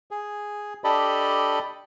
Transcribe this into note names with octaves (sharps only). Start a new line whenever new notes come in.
G#4
D4 G4 A4 D5 D#5 B5